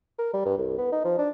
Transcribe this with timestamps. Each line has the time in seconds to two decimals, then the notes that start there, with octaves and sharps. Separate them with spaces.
0.19 A#4
0.34 G3
0.46 G2
0.58 C2
0.78 B3
0.92 D#4
1.05 F3
1.18 D4